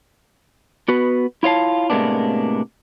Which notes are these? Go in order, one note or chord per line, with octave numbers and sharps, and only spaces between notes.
B3 F#4 B4
E4 F4 C#5 F5 A5
A2 C3 G#3 A#3 B3 D4